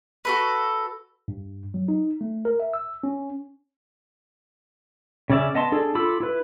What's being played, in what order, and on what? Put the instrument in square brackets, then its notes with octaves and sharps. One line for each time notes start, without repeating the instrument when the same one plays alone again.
[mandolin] F#4 A4 B4
[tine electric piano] G2
F#3
D#4
A3
A#4
E5
E6
C#4
[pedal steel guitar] C#3 C#4 D5 E5
B3 D#5 A5 C6
D4 G#4 A4
F4 A4 B5 D6 E6
E4 B4